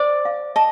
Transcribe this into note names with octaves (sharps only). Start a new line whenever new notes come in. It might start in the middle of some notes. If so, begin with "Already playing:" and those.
Already playing: C5 D5
F5
D#5 A5